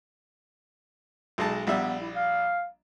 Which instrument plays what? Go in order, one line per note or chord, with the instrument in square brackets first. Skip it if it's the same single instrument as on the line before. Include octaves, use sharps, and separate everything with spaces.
[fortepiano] B1 G#3 A5
[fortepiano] A#1 G3 E5 [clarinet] B3
[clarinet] E4
F5